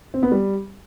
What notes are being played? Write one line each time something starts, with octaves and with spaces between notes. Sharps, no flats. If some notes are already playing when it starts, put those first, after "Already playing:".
C4
B3
G3